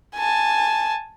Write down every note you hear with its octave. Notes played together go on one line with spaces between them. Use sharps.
G#5 A5